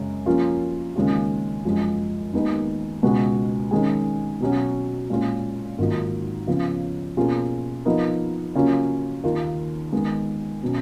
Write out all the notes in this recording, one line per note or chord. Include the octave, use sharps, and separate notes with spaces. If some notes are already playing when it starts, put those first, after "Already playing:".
Already playing: F#2 C#3 G#3
F3 A#3 C#4 F4
D#2 C#3 G#3 C#4 F4
F#2 F3 G#3
D#2 D#3 G#3 B3 D#4
C#2 B2 G#3 B3 F#4
D#3 G#3 C#4 G#4
B2 F#3 C#4 F#4
A#2 G#3 C#4 F4
G#2 D#3 F#3 A#3 F4
C#3 F3 B3
B2 A#3 C#4 F4 G#4
F3 B3 D#4 A#4
C#3 F#3 A#3 C#4 F4
D#2 D#3 A#3 F4
D#3 G#3 B3
B2 F#3 C#4